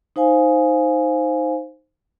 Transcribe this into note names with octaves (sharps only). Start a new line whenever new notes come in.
D#4 C5 F5 G#5